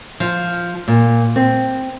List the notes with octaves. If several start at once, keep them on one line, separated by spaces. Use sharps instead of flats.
F3
A#2
C4